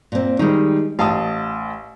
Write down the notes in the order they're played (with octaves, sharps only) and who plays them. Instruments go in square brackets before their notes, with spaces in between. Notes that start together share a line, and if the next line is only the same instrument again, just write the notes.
[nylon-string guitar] A#2 C4
[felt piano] D#3 G3 [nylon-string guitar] G#3 D#4
[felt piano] A1 A5 D#6 [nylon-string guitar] F5